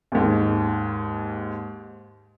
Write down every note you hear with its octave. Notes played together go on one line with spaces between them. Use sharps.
D#2 G#2